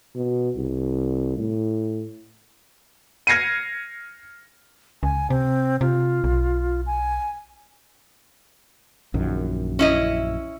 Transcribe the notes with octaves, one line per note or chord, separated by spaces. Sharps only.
B2
C2
A2
F6 G#6 A#6 C7 C#7 D#7
C#2 G#5
C3 C4
C3 F4
B1
G#5
A#1 F#2 D#3
C#4 E4 D#5